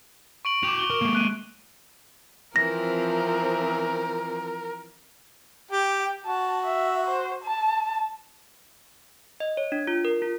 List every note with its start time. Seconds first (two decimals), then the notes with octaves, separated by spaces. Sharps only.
0.45 C#6 D7 F#7
0.63 F#4 G5 D6 F7
0.79 G7
0.90 A#4
1.02 G#3 A#3
1.15 F#6 D#7
2.56 E3 F3 C4 A#4 A#6
5.71 G4 G5
6.25 F#4 A5
6.65 E5
7.07 C5
7.44 A5
9.40 D#5
9.57 C#5
9.72 D4
9.87 F4
10.05 A#4
10.22 F4